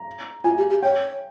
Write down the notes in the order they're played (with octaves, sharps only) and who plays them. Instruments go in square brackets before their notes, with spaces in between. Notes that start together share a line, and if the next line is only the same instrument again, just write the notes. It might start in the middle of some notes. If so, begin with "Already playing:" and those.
Already playing: [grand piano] A#5
[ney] F4 [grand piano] G#5
[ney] G4
G4
[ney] C#5 [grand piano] G5